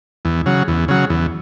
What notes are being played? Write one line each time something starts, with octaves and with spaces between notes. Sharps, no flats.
E2
C#3 F#3
E2
C#3 F#3
E2